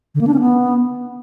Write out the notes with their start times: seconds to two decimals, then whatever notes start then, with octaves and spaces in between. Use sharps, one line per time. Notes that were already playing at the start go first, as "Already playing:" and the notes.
0.15 D3
0.21 A#3
0.27 D4
0.34 C#4
0.40 B3